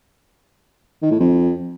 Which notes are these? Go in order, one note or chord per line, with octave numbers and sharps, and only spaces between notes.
D#3
A2
F2